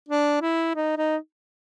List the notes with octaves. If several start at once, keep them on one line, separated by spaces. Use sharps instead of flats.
D4
E4
D#4
D#4